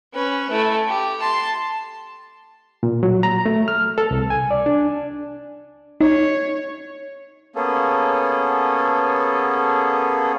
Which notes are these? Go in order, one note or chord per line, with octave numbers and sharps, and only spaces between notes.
C#4 B4
A3 E4
G4
A5 C6
A#2
F#3
A#5
A3
F6
A4
C2
G#5
D5
D4
D#4 C#5
A#3 B3 C#4 G#4 A4